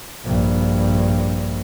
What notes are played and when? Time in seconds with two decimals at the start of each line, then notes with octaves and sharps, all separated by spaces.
0.24 A#1 G2